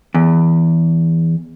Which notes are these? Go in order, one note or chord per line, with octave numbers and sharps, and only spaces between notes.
E2